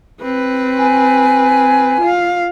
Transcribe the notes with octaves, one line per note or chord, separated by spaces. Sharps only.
C4 B4
G#5
F4 F5